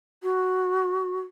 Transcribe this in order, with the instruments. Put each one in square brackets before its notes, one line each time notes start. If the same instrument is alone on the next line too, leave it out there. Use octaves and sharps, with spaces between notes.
[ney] F#4